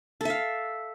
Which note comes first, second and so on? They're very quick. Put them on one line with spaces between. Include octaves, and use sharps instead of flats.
A4 E5 F5